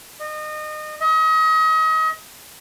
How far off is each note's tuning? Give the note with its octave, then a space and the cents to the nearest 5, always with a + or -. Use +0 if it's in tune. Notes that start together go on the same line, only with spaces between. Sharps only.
D#5 -30
D#5 +35